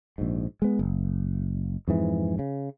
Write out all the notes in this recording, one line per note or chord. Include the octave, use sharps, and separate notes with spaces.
A#1 G#2
G#3 B3
F#1
F2 G#2 E3
C#3